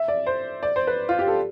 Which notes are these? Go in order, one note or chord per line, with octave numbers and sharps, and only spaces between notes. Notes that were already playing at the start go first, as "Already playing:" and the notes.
Already playing: E5
D5
C5
D5
C5
B4
F4
G4
A4